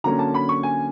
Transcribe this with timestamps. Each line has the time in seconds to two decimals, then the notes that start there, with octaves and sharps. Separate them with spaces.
0.04 D3 F#3 A#3 C#4 A#5
0.19 A5
0.34 B5
0.49 C#6
0.63 G#5